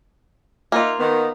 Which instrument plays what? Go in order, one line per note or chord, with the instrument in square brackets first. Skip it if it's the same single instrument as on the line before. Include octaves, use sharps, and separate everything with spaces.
[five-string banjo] A#3 F4 [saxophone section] D#4 E5
[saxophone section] D#3 B3